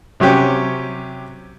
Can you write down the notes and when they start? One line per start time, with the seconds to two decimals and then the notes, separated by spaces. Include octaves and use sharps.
0.20 C3 F#3 C#4 G4